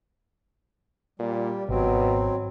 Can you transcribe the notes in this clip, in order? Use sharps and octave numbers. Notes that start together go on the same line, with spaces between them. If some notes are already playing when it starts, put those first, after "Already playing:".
A#2 G3
G#1 B2 F#3 C4